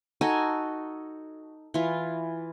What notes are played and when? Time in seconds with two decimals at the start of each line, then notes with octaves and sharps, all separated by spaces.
0.21 D#4 F#4 A4 G#5
1.74 E3 F4